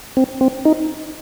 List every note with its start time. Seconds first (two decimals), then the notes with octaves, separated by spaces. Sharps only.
0.17 C4
0.41 C4
0.65 D#4